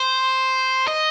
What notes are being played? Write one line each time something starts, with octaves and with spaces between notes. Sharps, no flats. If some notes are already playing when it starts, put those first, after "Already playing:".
Already playing: C5
D#5